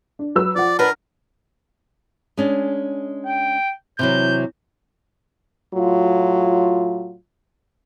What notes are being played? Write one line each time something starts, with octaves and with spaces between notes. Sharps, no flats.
D4
F#3 B4 E6
F3 D5 F#5
D4 A#4 B4
G#3 C#4 D4
G5
C3 E3 F#3 G6
A2 F#3 F4